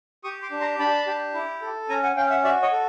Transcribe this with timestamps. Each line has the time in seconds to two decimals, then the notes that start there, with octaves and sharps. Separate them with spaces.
0.24 G4 C#6 D#6
0.42 C6 D6
0.51 D4
0.61 A#5 C6
0.79 D4 A5 B5
1.07 G4
1.34 E4
1.62 A4
1.89 C#4 G#5 A#5
2.03 F#5 G#5
2.16 C#4 F5 G5
2.30 E5 F#5
2.44 F#4 D5 E5
2.62 C#5 D#5
2.72 A4